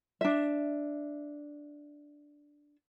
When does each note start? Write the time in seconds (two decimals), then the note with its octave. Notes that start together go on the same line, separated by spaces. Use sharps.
0.21 D4 E5